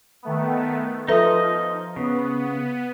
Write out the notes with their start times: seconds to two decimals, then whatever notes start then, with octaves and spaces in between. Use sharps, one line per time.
0.23 D#3 A3 B3
1.08 F3 D#4 A4 B4 D#5 E5
1.96 C#3 B3